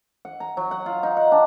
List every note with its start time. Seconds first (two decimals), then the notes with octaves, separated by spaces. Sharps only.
0.25 F#5
0.40 A#5
0.57 F#3
0.71 F#5
0.86 F4
1.03 D#4
1.17 F#5
1.32 D4